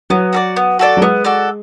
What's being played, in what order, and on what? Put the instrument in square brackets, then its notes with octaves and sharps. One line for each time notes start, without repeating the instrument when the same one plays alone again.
[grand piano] F#3 [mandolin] B3
[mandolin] F#4 A4 D5
B3
F#4 A4 D5
[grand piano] F#3
[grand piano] G#3 [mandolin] B3
[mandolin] F#4 A4 D5